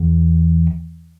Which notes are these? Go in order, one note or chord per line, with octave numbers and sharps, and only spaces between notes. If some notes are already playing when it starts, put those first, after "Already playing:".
Already playing: E2